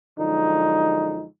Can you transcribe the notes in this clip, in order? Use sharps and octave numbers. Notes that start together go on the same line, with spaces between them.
F#2 D3 F3 G#3 D#4